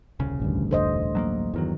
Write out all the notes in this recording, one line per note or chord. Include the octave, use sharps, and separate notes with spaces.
D#1 C2 C#3
A1 D2 G2
F1 D3 C5 D#5
F#3 A3 A#3
E2 G2 D#3 F#3